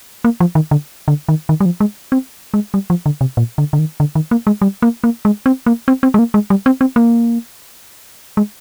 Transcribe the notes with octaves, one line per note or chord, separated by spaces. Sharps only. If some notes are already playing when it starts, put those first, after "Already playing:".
A#3
F3
D#3
D3
D3
D#3
D#3
G3
F3
G#3
C4
G#3
G3
F3
D3
C3
A#2
D3
D3
D#3
D3
D#3
A#3
G#3
G3
A#3
A#3
G#3
C4
A#3
C4
C4
G#3
A#3
G#3
G3
C4
C4
A#3
G#3